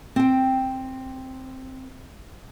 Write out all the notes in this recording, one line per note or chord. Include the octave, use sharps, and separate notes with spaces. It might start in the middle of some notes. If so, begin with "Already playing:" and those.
C4 G5